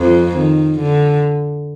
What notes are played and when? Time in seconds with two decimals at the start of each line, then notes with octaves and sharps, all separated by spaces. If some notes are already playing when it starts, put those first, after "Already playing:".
Already playing: F2 F3
0.36 D#3
0.79 D3